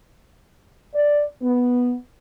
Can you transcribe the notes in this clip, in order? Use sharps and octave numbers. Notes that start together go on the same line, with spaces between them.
D5
B3